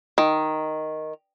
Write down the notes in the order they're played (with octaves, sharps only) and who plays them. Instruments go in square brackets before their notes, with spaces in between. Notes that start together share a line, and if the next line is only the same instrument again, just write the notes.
[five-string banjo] D#3